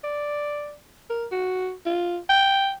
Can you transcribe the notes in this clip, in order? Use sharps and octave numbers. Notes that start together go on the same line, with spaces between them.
D5
A#4
F#4
F4
G5